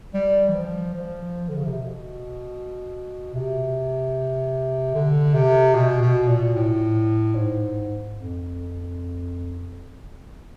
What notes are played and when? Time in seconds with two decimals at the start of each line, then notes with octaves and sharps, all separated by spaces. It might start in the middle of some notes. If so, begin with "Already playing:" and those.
0.14 G3
0.48 E3
0.54 F3
0.94 F3
1.49 D3
1.57 C#3
1.65 C3
1.74 B2
3.34 C3
4.94 D3
5.34 C3
5.75 B2
6.01 B2
6.28 A#2
6.55 A2
7.35 G#2
8.15 F2